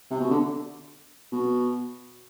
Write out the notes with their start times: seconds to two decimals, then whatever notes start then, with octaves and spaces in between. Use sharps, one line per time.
0.11 C3
0.21 B2
0.31 D3
1.32 B2